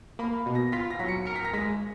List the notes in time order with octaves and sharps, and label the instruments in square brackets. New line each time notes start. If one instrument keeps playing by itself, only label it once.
[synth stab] A#3 [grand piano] B5
[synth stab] B2
[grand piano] A#6
[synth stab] F4 [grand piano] B6
[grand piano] A#6
[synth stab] F#3 [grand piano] B6
[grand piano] C#7
[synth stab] A#4 [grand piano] C#7
[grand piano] B6
A#6
[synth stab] G#3 [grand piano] B6